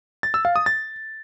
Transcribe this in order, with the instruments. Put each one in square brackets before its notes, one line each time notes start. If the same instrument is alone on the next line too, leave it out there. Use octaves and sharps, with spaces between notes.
[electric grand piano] A6
E6
F5
D#6
A6